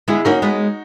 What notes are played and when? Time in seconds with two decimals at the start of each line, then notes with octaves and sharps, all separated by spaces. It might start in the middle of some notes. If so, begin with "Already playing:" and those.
0.08 G#3 B3 E4 G#4
0.25 A#3 C#4 D#4 F#4
0.42 G#3 B3